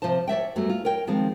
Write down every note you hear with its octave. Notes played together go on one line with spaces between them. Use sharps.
C3 F3 F4 C5 A5
C#5 D5 E5 G5
F#2 F#3 G3 A3 B3
F4
A#4 C#5 G5
D#3 F3 G#3 C4